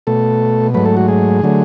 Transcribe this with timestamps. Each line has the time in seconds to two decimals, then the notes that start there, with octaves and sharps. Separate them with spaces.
0.07 B2 A3 A4
0.74 G#2 F#3 A3 B4
0.86 A4
0.97 F#4
1.08 G#4
1.43 D3 F#3 A3